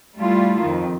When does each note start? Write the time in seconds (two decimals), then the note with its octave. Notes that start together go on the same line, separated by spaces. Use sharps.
0.18 G3 A3 E4 F4
0.62 F2 D#3